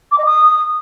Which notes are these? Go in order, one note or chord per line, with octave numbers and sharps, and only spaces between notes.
D6
D#5
D#6